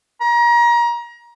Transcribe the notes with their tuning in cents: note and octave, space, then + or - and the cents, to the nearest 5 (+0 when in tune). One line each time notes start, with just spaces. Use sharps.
A#5 +30